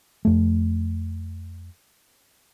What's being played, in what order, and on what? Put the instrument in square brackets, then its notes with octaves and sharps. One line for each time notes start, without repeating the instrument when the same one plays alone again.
[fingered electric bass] F2 A3